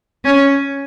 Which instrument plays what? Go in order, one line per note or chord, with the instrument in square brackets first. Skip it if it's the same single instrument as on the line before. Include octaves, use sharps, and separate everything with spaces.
[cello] C#4